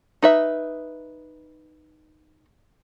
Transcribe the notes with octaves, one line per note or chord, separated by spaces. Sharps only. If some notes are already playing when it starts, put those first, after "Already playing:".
D#4 B4 E5